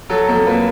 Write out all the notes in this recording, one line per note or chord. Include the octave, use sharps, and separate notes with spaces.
F#3 A4
F2 A4
A#3 B4